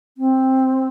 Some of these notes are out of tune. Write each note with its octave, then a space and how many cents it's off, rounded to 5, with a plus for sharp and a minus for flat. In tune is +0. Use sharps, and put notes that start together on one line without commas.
C4 +5